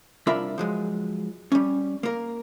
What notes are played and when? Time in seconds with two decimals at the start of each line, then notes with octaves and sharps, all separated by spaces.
0.27 C2 D4 F4 A#4 E5 B5
0.58 F3 F#3 G#3
1.52 G3 C#4
2.03 A#3 A#4